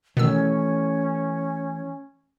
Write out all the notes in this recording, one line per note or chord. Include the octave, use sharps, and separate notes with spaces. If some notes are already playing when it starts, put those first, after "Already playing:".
B2 D#3 E3 A3 C#4 E6